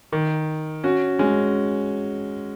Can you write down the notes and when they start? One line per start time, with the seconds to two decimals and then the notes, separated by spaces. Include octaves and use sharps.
0.12 D#3
0.84 C#4 F#4
1.19 G#3 C#4